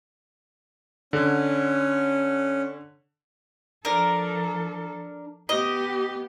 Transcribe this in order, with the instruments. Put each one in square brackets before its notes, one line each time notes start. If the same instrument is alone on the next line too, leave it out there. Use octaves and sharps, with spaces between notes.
[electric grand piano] D3 [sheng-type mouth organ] C#4
[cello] F3 A4 [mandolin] D4 A#4
[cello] B3 G4 [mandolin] D#5